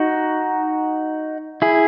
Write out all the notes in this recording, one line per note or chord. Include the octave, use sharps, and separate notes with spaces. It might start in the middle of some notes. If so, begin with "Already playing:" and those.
Already playing: D#4 F#4
E4 G#4